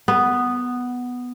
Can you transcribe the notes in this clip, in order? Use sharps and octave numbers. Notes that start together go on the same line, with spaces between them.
B3